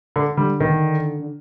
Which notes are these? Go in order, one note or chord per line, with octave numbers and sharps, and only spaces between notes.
D3
D3 G3
D#3
D3